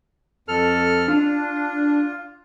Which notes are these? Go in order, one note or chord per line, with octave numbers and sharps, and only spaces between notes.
F2 A4 F6
D4 F4